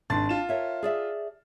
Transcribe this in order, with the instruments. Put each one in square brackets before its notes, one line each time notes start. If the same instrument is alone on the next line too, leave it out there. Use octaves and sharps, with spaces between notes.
[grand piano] G#1 C6 A6 [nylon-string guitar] D4
[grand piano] F4 E7
[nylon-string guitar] A#4 C#5 E5
G#4 D5 E5